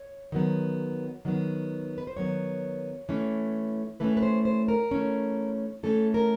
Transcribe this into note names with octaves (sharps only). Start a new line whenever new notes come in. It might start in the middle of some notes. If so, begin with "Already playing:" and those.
Already playing: C#5
D#3 F#3 B3
D#3 F#3 B3
B4
C5
D#3 F#3 B3 C#5
E3 A3 C#4
E3 A3 C#4 B4
B4
C5
C5
A#4
E3 A3 C#4
E3 A3 C#4 A4
A#4